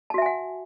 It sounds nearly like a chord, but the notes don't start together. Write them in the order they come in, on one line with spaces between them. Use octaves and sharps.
A5 F#4 E5 G#5 F#5